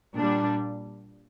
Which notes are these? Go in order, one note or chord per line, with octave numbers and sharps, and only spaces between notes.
A#2 G3 D4